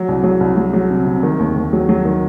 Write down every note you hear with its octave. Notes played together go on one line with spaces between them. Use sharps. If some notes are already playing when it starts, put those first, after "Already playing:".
Already playing: F#3
C2
F#3
C2
F#3
F#3
C3
C3
D#3
D#2
D#2
F#3
F#3
D#3